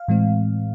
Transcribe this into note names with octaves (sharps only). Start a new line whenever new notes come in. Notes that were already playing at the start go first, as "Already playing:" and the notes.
Already playing: F5
A2 E3 G#3 C4